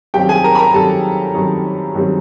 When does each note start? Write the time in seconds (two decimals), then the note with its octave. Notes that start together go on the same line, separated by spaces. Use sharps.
0.14 F#2 D#3 G3 C4 G4 G5
0.29 G#4 G#5
0.44 A#4 A#5
0.55 B5
0.59 A#4 A#5
0.74 F#2 D#3 G3 C4 A4 A5
1.34 F#2 D#3 G3 C4
1.95 F#2 D#3 G3 C4